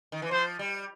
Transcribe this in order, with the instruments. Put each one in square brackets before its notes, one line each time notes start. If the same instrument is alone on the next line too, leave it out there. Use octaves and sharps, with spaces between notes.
[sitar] D#3
E3
[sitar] F3 [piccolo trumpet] C5
[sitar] G3